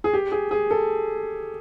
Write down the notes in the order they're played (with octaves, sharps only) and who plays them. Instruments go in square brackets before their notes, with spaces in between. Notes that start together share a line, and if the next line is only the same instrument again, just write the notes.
[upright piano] G#4
G4
G#4
G#4
A4